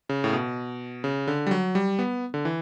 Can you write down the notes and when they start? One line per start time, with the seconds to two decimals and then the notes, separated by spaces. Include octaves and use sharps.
0.09 C#3
0.24 A2
0.33 B2
1.04 C#3
1.28 D3
1.47 G3
1.51 F#3
1.75 G3
1.99 B3
2.34 D3
2.45 E3